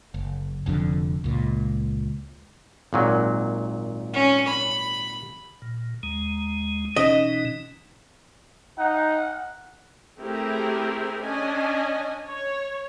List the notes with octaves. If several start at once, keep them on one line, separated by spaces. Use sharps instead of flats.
F#1
F1 F2 D3
C#2 A#2
G#1 A#2 F#3
C#4
B5
A#2
D#2 G#3
B2 E3 C#4 D#4 D#5
D#4 F#5
A3 C4 E4 G4 G#4 A#4
C#4 D4 D#5 G#5
C#5